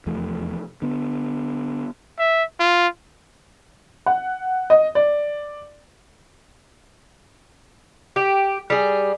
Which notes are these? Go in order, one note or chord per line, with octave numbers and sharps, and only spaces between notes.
F1 E2 F3 A3
D3 B3
E5
F4
F#5
D#5
D5
G4
G3 G#4